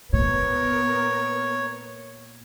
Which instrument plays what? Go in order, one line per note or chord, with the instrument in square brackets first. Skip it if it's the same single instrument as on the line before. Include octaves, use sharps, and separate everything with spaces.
[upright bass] A#2 [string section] B3 A#4 [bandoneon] C#5